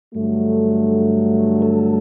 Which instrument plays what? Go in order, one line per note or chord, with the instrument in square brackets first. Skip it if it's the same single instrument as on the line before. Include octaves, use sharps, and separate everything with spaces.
[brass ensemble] G2 D3 F#3 A3
[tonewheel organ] A4